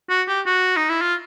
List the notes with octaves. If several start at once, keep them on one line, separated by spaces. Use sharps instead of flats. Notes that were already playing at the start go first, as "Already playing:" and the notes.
F#4
G4
F#4
D#4
E4
F4